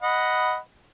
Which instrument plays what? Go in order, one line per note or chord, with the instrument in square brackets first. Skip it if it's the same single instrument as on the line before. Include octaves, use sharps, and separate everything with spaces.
[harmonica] D#5 F#5 B5